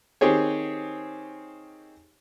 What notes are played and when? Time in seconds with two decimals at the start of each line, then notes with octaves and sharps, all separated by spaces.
0.21 D#3 C4 G4 G#4 C#5